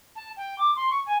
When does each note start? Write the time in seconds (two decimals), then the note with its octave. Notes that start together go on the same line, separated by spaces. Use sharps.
0.15 A5
0.36 G5
0.58 D6
0.75 C6
0.90 C#6
1.06 G#5